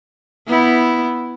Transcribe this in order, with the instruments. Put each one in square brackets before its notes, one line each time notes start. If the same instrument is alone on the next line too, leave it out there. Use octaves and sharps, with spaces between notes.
[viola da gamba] B3 E4